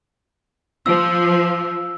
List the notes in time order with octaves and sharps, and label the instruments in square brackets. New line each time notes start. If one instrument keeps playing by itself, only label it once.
[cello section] F3 [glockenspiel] E6